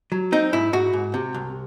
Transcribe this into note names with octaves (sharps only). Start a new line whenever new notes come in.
F#3
C4 D#4
G#2 E4
G#2 F#4
G#2
C3
C2